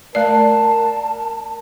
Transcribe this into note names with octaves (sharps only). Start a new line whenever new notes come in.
A3 A#4 D5 A5